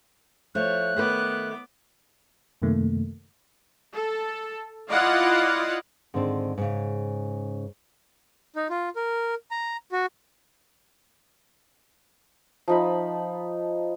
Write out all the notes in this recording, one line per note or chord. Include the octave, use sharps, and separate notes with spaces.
F3 A3 C#5 F#6
D#3 A3 B3 B4 D6
F#2 C3 D#3 A3 A#3
A4
E4 F4 D5 D#5 F5 F#5
G#2 D3 D#3 C4 D4
G#2 C#3
D#4
F4
A#4
A#5
F#4
F3 D#4 B5